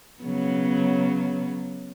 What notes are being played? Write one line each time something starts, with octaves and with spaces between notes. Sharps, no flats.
C#3 F#3 B3